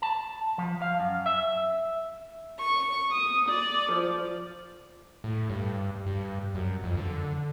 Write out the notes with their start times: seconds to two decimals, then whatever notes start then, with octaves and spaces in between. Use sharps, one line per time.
0.02 A5
0.58 F3
0.82 F5
1.00 F#2
1.26 E5
2.58 C#6
3.11 D#6
3.49 D5
3.92 F3
5.24 A2
5.50 G2
6.06 G2
6.55 F#2
6.84 F2
6.97 D3